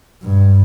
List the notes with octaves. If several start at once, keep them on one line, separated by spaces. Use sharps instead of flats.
G2